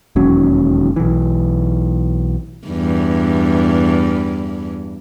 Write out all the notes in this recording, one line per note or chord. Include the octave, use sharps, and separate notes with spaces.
E1 D#2 F#3 C#4
B1 E3
E2 G2